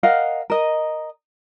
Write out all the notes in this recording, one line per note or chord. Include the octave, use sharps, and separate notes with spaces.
A#4 D#5 F5 F#5
A#4 D#5